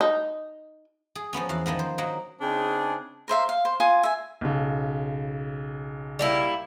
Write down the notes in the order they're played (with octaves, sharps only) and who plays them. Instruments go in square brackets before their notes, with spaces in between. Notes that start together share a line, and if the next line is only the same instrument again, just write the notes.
[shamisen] D#4
[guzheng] G#4
F3 A#3 B3 C#4
E2 F#4 F5
D#3 F3 A#3 B3
C5
F#3 A#3 D#4
[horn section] C#3 C4 D4 D#4 G#4
[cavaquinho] A#4 C5 E5 F5
F5
C5
F4 G#5 D#6
E5 G#5
[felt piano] B1 C#3
[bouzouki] G3 A#3 E4